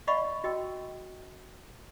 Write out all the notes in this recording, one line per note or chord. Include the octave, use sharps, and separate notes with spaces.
D5 D#5 F5 F#5 B5 C#6
F#4 D#5 G5 E6